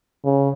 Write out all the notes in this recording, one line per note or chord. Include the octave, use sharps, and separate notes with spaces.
C#3